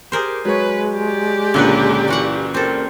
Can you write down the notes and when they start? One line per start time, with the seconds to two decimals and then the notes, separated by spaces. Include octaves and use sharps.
0.12 G4 G#4 A#4 C5
0.45 F#3 G#3 B4 C#5
0.94 G4 D5
1.54 C#2 A#2 D3 F#3 B4 F#6
2.08 E3 E4 F#4 F#5
2.54 C4 A4 A#4